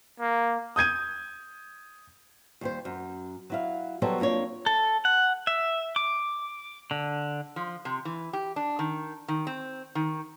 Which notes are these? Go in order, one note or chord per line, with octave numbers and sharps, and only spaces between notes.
A#3
D#6 G6 G#6 D#7
D#2 G3 C5
F#2
F#3 E4 F5
F#3 G3 B3 A4 C5 C#5
F2 A#3 D4 C#5
A4
F#5
E5
D6
D3
F3
C3
E3
G4
D4
D#3
D#3
C4
D#3